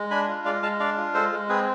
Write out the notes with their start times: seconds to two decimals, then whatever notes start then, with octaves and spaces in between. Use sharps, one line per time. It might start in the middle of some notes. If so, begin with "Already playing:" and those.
Already playing: G#3
0.11 D4 G#5 B5
0.28 F4
0.45 G#3 D5 F5
0.63 G#3 F5 A5
0.80 D4 D5 F5
0.97 F4
1.14 G#3 A4 C5
1.32 G#3
1.49 C4 G#4 B4